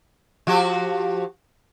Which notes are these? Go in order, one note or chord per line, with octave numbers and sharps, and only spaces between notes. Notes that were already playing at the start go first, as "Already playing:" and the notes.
F3 F#4 G4